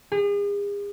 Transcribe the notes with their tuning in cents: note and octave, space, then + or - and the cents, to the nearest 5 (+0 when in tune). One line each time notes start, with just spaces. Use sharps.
G#4 -40